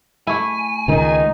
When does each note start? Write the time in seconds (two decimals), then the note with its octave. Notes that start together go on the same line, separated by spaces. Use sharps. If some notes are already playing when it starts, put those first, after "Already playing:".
0.27 A3 E4 G#5
0.88 C#2 D#3 D#4